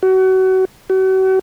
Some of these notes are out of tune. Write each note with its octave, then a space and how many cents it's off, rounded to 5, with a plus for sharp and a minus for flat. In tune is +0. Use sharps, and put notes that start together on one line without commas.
F#4 +30
F#4 +40